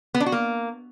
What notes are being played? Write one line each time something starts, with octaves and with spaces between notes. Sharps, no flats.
B3
D4
F#4
A#3